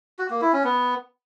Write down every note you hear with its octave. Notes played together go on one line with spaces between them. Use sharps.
F#4
A#3
E4
C#4
B3